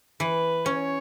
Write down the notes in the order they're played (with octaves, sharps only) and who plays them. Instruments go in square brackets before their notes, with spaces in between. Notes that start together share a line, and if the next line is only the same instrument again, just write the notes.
[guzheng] E3 [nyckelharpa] B4
[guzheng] C#4 [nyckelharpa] C#5